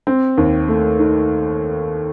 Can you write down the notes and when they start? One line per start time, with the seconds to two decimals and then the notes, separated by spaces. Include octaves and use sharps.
0.07 C4
0.38 D#2
0.68 A3
0.99 D#3